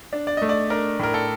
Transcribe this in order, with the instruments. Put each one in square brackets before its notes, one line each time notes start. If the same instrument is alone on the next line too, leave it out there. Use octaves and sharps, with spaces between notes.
[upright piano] D4
[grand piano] D5
[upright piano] A3 [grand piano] D#5
[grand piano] D5
[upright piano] D4 [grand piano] A#4
[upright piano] A2 [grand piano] A#4
[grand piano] A4